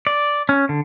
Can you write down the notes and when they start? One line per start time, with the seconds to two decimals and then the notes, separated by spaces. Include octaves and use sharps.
0.07 D5
0.49 C#4
0.69 D3